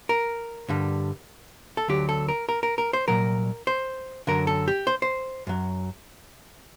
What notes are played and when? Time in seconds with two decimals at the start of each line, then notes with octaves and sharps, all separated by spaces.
0.09 A#4
0.69 G2 D3 G3
1.77 A4
1.88 D2 D3 F#3 G4
2.09 A4
2.28 A#4
2.49 A#4
2.63 A#4
2.78 A#4
2.93 C5
3.08 C2 A#2 F#3 A#4
3.67 C5
4.27 F#2 D3 F#3 A#4
4.47 A4
4.68 G4
4.87 C5
5.02 C5
5.47 F#2 F#3